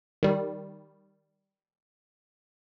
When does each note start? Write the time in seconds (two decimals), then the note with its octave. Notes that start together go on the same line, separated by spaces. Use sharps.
0.23 D#3 G3